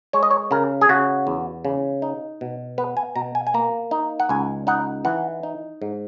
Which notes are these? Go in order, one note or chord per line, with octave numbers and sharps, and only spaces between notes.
G#3 C#5
D#5
C#5
C#3 A#4
G#4
C#3 F#4
E2
C#3
D#4
B2
B3 B4
G#5
B2 A#5
G#5
G#5
A#3 A#5
D#4
F#5
C#2 G#5
D#4 F#5
E3 F#5
D#4
G#2